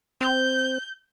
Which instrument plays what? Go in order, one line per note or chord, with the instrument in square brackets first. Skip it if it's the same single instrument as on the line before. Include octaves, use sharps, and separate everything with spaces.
[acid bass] C4 [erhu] G6